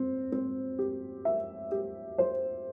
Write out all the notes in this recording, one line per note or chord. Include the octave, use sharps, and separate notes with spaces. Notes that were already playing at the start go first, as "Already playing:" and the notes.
Already playing: C4
C4
G4
E5
G4
C5